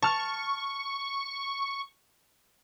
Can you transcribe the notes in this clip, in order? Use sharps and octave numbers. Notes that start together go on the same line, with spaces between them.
A5 C#6 F6